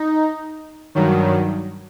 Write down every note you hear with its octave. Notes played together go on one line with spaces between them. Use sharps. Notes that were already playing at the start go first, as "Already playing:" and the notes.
Already playing: D#4
G2 D#3 F#3